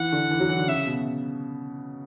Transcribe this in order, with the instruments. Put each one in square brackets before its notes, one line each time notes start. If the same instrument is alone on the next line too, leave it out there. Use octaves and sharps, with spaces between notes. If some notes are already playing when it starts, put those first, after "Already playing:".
Already playing: [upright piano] E3 [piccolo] F#5
[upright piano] D3
E3
F#3
E3
D3
[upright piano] C#3 [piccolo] E5
[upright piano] B2